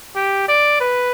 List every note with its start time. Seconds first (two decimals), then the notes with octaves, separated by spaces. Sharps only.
0.16 G4
0.48 D5
0.81 B4